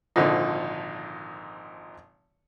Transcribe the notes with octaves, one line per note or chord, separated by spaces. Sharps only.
G#1 A#2 D3 F3 D#4